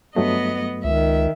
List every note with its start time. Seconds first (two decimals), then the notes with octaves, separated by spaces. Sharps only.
0.16 G2 F#3 A3 B3 D#5
0.84 C#2 D#3 E5